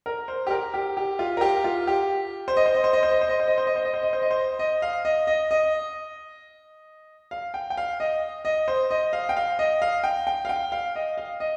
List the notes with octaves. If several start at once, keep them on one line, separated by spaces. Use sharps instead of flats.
A#4
C5
G4
A#4
G4
G4
F4
A#4
G4
F4
G4
C5
D#5
C5
D#5
C5
D#5
C5
D#5
C5
D#5
C5
D#5
C5
D#5
C5
D#5
C5
D#5
C5
D#5
C5
D#5
F5
D#5
D#5
D#5
F5
G5
G5
F5
D#5
D#5
C5
D#5
F5
G5
F5
D#5
F5
G5
G5
F5
G5
F5
D#5
F5
D#5